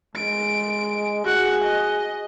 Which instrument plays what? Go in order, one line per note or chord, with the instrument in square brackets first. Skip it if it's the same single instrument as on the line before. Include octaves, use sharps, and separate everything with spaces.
[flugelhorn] G#3 [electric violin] D7
[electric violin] F#4 F#5 [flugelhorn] G#4
[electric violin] D#5